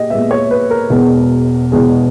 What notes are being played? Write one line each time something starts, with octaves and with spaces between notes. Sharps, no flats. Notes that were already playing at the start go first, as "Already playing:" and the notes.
Already playing: A#2 G4 G#4 D#5
A#2 G#3 B3 E5
C#5
B4
A#4
E1 E2 B2 G#3
E1 E2 B2 G#3